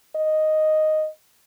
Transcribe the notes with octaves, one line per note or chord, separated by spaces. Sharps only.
D#5